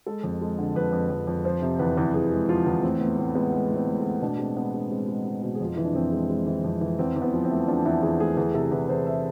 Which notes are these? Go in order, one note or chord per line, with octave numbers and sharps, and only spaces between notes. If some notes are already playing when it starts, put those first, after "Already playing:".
G#3 A4
F2
G#3
D3
F2 B4
F2
F2
F2
F3 C5
C3
E2 B4
E2
E2 G#4
G#3
F3 F4
E2
A2 C4
A2 B3
A2 C4
G#3 B3
G#3
A2
C4
A2
A4
A2
B2 D4
G#3 C4
G#3 B3
G#3 D4
G#3 C4
G#3
G#3
B2
G#4
F2 F4
E3 E4
D4
F2 C4
G#3
G#3
E3
F2
E3
E2 C4
E2
B3
F3
C4
A3
F3 D4
E2 E4
E2 G#4
A3 G#4
E2 G#4
C3 A4
E2 B4
E2 C5
E5